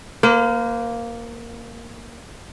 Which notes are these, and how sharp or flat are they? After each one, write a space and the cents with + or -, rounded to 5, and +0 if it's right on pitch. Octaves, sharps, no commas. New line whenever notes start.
A#3 +0 C5 -45